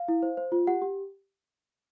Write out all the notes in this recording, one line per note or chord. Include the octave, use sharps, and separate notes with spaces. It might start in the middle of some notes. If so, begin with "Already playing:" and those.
Already playing: F5
E4
C5
C5
F4
G4 F#5
G4